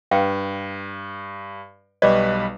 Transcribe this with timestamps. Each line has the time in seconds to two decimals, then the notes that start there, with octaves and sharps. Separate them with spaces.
0.11 G2 B4 F5 G5
2.02 B1 G3 B4 D5 D#5 C#6 D6